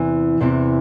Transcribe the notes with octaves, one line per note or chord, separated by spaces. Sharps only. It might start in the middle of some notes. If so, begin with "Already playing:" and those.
Already playing: E2 C3 E3
E2 C3 E3